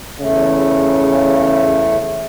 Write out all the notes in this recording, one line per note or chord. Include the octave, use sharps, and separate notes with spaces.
E2 C#3 A3